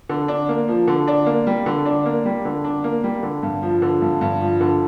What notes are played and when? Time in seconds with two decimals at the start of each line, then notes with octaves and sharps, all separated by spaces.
0.09 D3
0.28 D4
0.49 A#3
0.68 F3
0.88 D3
1.07 D4
1.26 A#3
1.47 G3
1.66 D3
1.86 D4
2.06 A#3
2.25 G3
2.45 D3
2.64 D4
2.84 A#3
3.04 G3
3.23 D3
3.43 G2
3.62 F3
3.82 D3
4.02 G2
4.21 G2
4.41 F3
4.61 D3